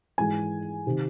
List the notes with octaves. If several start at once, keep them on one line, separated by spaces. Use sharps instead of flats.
G#2 E3 G#3 G#5
C3 D#3